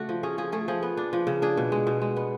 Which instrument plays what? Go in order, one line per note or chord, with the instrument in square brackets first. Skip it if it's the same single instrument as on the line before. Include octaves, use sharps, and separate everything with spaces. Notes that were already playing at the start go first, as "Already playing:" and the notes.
Already playing: [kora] C#3 A3 D4 F#4
F3
C#4 G#4
F3 G#4
A3 G#4
F3 G#4
B3
D4
F3
C#3
D4 G#4
B2
G#3
B2
G#3
B3